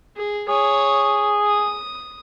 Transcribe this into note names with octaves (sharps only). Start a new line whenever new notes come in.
G#4
G#4 C#5 D#6
D#6